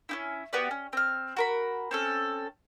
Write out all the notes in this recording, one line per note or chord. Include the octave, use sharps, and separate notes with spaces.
C#4 D#4 E4
B3 F#4 G4 D5
C#4
C4 F6
F#4 A#4 B5
C4 C#4 A4